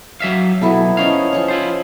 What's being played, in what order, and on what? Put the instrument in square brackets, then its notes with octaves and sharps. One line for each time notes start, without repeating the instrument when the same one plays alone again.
[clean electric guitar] F#3 E5 F5
[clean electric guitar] B2 F#3 [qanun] B3 E4 A4
[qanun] F3 D#4 C#5 [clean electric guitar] C#4 F5
[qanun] F3 C#4
[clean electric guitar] E4 F4 C5